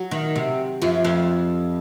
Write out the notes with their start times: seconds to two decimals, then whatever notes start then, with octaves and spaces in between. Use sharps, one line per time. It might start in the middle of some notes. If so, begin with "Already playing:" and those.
Already playing: F#3
0.11 D#3
0.36 C3
0.82 F#2 F3
1.05 F2